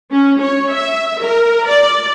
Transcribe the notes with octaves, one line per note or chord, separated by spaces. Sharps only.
C#4
C#5
E5
A#4
D5